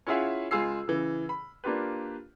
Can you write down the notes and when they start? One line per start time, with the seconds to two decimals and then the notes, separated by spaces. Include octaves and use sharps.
0.07 C#4 E4 F4 G#4 E5 F#5
0.51 C#2 G#3 F4 G#4 E6 C7
0.88 C#3 E3
1.29 B5
1.64 A#3 D4 F4 G4 B4